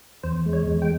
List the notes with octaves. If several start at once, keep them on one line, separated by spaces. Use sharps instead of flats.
E2 C5
G#3
C#5
E2
G5